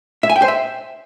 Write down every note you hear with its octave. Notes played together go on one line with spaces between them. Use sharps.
E5
G#5
G5
C5
E5